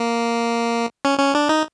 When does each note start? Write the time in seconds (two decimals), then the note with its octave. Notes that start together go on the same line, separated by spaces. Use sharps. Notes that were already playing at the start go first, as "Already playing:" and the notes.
Already playing: A#3
1.05 C#4
1.19 C#4
1.35 D4
1.49 D#4